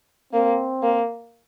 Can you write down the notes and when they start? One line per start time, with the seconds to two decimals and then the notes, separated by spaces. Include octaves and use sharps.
0.33 A#3 C4
0.82 A#3